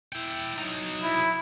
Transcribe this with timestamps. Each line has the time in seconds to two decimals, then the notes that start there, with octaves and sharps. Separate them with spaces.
0.12 E4 G5
0.58 F#3 D#4
1.02 E4